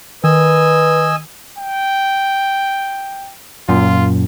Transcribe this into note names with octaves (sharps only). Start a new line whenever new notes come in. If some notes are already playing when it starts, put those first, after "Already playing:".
D#3 B4 D#5 G#5 E6
G5
F#2 A#2 F4